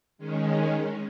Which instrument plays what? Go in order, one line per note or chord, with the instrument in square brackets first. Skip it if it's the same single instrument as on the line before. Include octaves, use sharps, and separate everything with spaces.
[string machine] D#3 G#3 C#4